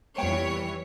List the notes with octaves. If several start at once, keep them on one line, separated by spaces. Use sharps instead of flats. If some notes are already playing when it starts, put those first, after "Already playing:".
C2 F2 E3 G3 B3 C#5 G5